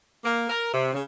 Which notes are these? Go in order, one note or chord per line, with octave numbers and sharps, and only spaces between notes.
A#3
A#4
C3
C#3